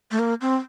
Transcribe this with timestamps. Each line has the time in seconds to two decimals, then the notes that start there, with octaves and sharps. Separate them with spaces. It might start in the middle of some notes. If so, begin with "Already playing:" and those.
0.11 A3
0.19 A#3
0.41 C4